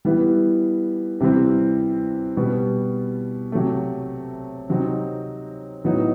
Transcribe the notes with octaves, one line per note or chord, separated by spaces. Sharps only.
E3 G3 B3 E4
C3 E3 G3 C4
B2 G3 B3
C3 F#3 A3
C3 F#3 C4 D#4
A2 F#3 B3 D#4